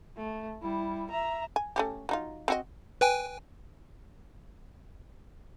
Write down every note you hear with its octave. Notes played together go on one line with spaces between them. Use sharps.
A3
G3 E4
E5 A#5
G#5
A3 C#4 G4
F#3 D#4 F4
C4 F#4 D#5
B4 G5 G#5